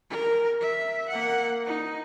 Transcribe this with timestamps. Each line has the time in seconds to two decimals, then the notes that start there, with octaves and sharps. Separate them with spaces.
0.10 A#4
0.61 E5
1.09 A#3 F#5
1.66 D#4